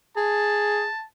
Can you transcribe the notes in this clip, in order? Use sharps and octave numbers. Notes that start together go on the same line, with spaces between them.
G#4 A5